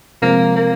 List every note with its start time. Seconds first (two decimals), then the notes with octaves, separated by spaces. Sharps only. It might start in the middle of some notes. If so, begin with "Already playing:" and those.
0.22 C3 F3 G#3 A#3 C4 F4
0.56 A#3